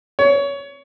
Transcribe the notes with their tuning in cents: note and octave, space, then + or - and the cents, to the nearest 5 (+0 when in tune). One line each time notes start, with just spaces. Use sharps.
C#5 +25